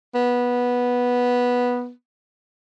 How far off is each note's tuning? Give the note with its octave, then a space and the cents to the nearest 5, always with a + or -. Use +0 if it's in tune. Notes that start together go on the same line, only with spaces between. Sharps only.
B3 -10